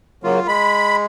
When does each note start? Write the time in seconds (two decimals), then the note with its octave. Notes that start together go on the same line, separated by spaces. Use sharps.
0.24 C#3 F#3 A#3 F4
0.48 G#3 B5